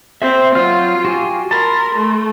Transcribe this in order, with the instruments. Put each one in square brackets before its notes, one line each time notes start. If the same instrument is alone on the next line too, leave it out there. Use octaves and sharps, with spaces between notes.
[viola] C4 [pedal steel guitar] E5
[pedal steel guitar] F#3 F5 F6 [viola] F4
[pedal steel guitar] F#4 G4 G#5
[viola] A#4 [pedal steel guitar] A5 B5 C6
[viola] A3